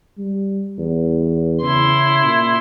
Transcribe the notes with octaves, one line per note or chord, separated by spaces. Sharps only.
G3
E2
C#3 E4 C6
A#2